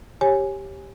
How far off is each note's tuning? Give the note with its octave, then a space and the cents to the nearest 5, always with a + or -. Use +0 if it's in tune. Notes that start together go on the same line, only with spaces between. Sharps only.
G4 +0 C#5 -15 G#5 +0